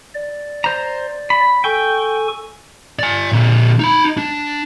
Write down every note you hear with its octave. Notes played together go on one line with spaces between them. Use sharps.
D5
C5 A#5
B5
A4 G5 G#5 C#6
D5 G#5
A#2 D3
D#4 B5
D4